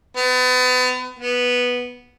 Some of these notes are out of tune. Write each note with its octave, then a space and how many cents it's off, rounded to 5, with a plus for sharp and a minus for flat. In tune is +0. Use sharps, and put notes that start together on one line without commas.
B3 +35
B3 -5